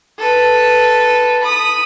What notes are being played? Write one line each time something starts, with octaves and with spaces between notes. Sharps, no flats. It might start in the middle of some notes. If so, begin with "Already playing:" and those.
A4 B4
B5 D#6